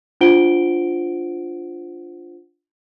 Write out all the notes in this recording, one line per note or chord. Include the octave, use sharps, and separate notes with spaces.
D4 F4 C5 F#5 D7 G7